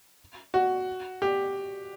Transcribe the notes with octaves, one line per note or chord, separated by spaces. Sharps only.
F#4
G4